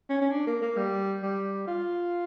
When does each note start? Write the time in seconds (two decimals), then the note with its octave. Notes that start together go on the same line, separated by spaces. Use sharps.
0.10 C#4
0.21 C#4
0.32 D4
0.47 A#3
0.62 A#3
0.77 G3
1.23 G3
1.67 F4